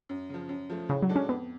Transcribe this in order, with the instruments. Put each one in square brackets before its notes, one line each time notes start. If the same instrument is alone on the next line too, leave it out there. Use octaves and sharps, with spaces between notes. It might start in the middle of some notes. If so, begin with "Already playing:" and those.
[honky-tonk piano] F#2
C#3 F3
F#2
F3 A3
[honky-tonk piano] A2 [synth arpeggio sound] C#3
[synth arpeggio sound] F#3
[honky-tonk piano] G#3 D4 F#4 A4
[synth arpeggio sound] C#4
[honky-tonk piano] F2 [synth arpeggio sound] B3